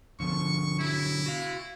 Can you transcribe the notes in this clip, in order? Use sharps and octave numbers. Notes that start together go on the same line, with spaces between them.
B2 D3 F3 C#6
F#3 E4
F#4 F5